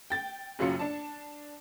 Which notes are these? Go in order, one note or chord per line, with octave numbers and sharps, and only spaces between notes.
G5 A6
F#1 F#2 F#3 F4 C#7
D4 A5